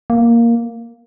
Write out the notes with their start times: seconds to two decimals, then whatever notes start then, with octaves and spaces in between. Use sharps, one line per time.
0.10 A#3